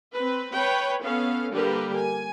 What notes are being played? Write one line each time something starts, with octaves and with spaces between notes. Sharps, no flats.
C4 B4
B4 C#5 G5 B5
B3 C#4 A4 F5
D3 G3 A#3 G4 A#4 B4
G#5